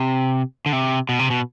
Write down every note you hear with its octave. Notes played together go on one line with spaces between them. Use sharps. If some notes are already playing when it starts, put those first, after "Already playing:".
Already playing: C3
D3
C3
B2
C3
B2